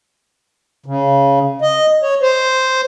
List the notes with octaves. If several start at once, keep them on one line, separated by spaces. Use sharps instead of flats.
C#3
D#5
C#5
C5